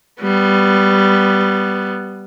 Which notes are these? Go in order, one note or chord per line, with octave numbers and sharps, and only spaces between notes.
G3 B3